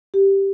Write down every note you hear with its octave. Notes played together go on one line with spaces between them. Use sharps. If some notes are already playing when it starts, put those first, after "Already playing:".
G4